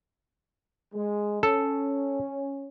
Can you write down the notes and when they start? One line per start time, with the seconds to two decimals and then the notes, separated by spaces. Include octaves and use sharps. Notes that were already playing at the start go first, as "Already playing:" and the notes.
0.94 G#3
1.43 C#4 A4